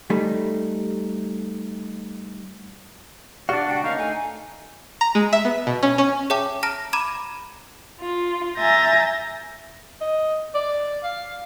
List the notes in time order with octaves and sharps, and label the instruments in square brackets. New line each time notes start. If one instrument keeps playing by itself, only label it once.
[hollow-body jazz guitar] G3 A3 D#4
[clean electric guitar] B2 G4 F5 [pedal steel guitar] D4 F#4 [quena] D5
[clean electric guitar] C#2 G5 [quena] F#5
[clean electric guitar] D2 A#3 C#4 [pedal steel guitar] D#4 [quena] F5
[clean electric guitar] A3 [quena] G#5
[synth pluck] A#5
G#3
E5
B3
B2
C#4
C#4
[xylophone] G#4 C#5 E5 G5 A5 D6
A5 A#5 F6 A#6 D7
A#5 B5 D6 G#6 D#7 E7
[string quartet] F4
E5 G#5 A#5 G6 A6 A#6
[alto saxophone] D#5
D5
F5